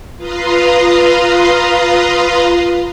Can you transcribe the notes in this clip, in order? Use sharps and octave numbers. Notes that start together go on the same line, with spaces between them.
F4 B4 F5 A#5 C6 D#6